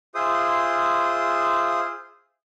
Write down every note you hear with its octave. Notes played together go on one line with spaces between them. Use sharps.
F4 G#4 C5 E5 C6 D#6